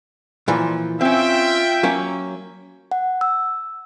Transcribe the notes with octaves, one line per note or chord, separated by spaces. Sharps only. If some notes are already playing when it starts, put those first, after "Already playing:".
A#2 E3 F3
C4 C#4 F4 E5 G5
F#3 A#3 C#4
F#5
E6